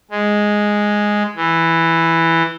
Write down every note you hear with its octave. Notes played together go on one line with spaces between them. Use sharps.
G#3
E3